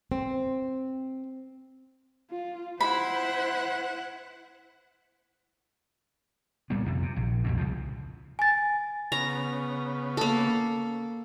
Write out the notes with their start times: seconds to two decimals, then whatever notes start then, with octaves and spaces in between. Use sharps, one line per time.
0.12 C4
2.30 F4
2.80 E4 C5 F#5 B5
6.70 C2 A#2 G3 B3
6.86 F#1 F2 C3 D#3
7.02 C3
7.16 A#1
7.44 B1 F2 B2
7.57 C2 C#3 F3
8.39 G#5 A6
9.12 C#3 B3 A#5
10.17 A#3 A4